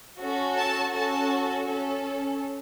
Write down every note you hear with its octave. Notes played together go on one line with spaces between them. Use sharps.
C#4 F#4 A4
A5
C#4 F#4 A4 A5
C#4 A4